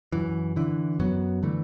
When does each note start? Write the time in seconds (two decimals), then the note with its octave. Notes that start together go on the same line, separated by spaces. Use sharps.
0.12 F#2 E3
0.56 D3 E3
0.99 F#2 F#3 B3
1.43 D3 E3 A3